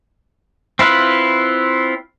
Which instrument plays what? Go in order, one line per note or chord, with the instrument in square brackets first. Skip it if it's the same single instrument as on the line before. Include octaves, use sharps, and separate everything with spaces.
[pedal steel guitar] C4 E4 F4 B4